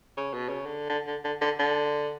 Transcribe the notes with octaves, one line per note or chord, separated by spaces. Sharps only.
C#3
B2
C#3
D3
D3
D3
D3
D3
D3